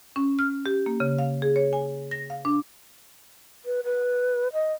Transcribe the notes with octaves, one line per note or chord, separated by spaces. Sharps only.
C#4
F6
G4
A#3
C#3
F5
G#4
C#5
G#5
A#6
F5
D4
B4
B4
D#5